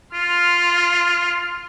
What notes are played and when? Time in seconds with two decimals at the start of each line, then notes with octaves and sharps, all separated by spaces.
0.14 F4 C6 F6